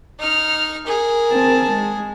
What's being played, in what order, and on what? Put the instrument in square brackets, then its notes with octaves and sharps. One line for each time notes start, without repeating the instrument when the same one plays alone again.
[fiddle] D#4 F6
[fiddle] G#4 [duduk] A#4
[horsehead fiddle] C4 A5
G#3